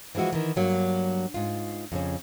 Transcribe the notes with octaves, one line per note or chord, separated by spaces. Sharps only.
E3 F3 G#3 E4 F#4
D#3 E3
G2 F#3 A#3
G#2 F4
F2 C#3 C#4